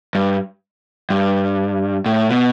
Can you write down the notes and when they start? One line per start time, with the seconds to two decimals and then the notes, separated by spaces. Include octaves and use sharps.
0.15 G2
1.10 G2
2.06 A2
2.29 B2